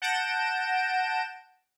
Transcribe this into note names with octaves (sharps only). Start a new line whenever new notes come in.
F#5 A5 G6 A#6 D7 E7